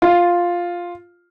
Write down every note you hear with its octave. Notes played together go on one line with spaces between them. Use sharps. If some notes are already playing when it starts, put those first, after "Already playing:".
F4